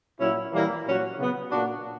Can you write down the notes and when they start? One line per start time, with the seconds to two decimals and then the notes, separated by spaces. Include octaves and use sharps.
0.19 A#2 F#3 C#4 E4
0.52 E3 G3 A#3 E4
0.86 A#2 F#3 C#4 F#4
1.18 C#3 F#3 B3
1.51 A#2 A#3 D4 F#4